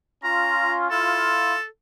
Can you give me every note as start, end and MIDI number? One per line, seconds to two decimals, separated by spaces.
0.24 0.86 61
0.24 0.86 65
0.24 0.74 82
0.91 1.54 64
0.91 1.54 65
0.91 1.65 69